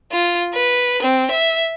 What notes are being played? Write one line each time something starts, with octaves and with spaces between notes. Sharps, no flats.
F4
B4
C4
E5